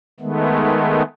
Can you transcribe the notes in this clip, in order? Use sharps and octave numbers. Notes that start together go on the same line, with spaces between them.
D#3 G#3 A3 B3